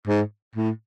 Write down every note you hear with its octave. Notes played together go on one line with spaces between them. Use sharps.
G#2
A2